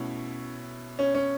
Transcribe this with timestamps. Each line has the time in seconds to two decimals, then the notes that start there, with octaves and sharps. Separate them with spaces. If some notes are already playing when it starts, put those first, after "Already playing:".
Already playing: B2 A3 C#4 E4 C#5
0.99 C#4
1.15 C#4